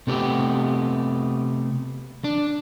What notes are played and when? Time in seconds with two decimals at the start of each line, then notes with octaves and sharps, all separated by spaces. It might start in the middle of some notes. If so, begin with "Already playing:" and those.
0.07 C3 A3 B3 G4
2.24 D4